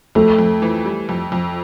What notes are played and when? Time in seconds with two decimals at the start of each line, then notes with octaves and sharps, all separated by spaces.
0.15 F2 A3
0.39 F2
0.62 E3
0.85 G3
1.09 F2
1.32 F2